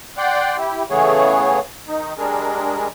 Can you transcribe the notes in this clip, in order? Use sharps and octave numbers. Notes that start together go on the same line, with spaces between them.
D5 F#5 G5 C6
E4 G4
C#3 E3 A3 B3 G#4 C#5
D#3 D#4
G3 G#3 D4 G#4 A#4